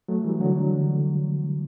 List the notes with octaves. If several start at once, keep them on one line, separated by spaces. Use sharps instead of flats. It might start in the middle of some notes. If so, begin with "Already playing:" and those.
F#3 A3
E3 G3
D3 F#3